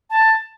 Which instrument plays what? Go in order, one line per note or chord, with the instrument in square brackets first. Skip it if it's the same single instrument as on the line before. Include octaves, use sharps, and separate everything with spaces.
[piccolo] A5